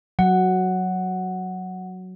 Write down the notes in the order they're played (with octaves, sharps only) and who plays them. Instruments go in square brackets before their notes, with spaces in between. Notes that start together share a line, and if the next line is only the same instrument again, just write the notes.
[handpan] F#3 [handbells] F#5